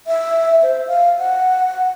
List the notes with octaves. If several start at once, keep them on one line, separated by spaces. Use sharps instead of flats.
E5
C5
F5
F#5